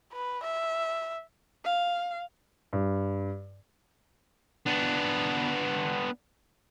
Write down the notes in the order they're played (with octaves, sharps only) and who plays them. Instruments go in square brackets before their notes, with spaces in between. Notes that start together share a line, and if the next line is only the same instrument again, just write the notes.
[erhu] B4
E5
[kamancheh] F5
[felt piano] G2
[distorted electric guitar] B3 D4